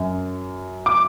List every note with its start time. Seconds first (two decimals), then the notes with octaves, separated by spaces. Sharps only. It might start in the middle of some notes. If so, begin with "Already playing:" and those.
Already playing: F#2
0.86 D6